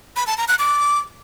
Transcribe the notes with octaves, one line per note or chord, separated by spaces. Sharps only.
B5
A5
A#5
F#6
D6